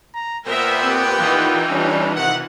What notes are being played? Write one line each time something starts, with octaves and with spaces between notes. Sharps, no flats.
A#5
A#2 B3 A#4 C5 E5 G5
C4 G4 B4
E3 D#4 F4
G3 C#4 D4
C3 D#3 F#5